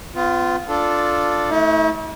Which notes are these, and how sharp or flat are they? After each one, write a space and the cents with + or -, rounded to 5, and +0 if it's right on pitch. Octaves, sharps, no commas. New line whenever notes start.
B3 +45 F4 +0
D4 +0 F4 +0 A4 +0
A3 +0 E4 -45